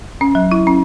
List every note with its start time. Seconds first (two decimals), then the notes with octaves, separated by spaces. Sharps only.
0.21 C#4
0.35 F#3
0.52 E4
0.67 C#4